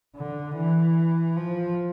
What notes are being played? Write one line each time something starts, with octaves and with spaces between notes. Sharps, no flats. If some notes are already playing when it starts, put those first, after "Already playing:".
D3
E3
F3